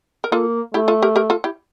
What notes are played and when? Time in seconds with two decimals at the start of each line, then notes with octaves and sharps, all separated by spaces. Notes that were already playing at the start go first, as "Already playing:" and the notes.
0.24 A#4
0.32 A#3 F4 A4
0.74 A3 E4 G4
0.88 F4 A4
1.02 G4 A#4
1.16 G4 A#4
1.30 F4 A4
1.44 E4 G4